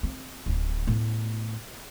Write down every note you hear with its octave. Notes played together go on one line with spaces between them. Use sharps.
C4
D1
A2 B3